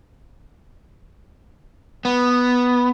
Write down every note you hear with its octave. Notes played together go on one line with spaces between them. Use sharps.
B3